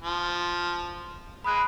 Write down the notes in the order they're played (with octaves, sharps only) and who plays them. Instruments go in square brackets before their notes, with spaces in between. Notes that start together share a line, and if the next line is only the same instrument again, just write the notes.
[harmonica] F3
[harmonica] G#3 A#3 [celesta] B5 D#6 F#6